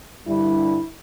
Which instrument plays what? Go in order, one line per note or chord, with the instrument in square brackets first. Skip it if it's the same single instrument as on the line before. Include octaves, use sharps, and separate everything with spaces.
[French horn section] G2 D3 G3 E4